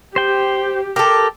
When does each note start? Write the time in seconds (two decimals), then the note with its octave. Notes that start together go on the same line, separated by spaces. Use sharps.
0.16 G4 C5 G5
0.96 G4 A4 A#4